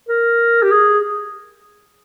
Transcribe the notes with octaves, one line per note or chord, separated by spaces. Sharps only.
A#4
G4
G#4